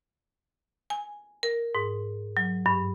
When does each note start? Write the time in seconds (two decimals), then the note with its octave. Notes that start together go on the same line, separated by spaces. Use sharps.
0.90 G#5
1.43 A#4
1.75 G#2
2.37 F#3
2.66 G2